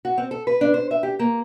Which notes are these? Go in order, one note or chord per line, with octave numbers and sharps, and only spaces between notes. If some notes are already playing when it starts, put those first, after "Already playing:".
F#4
C4
A4
B4
D4
C5
E5
G4
A#3